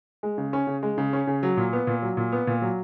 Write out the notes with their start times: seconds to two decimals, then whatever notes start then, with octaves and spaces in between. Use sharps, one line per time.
0.23 G#3
0.38 C#3
0.53 C#4
0.67 C#3
0.83 G#3
0.98 C#3
1.13 C#4
1.27 C#3
1.43 F#3
1.57 A#2
1.73 B3
1.87 A#2
2.02 F#3
2.17 A#2
2.32 B3
2.47 A#2
2.62 F#3